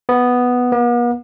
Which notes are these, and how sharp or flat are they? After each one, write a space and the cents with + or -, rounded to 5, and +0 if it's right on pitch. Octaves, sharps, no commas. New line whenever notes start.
B3 +0
B3 -45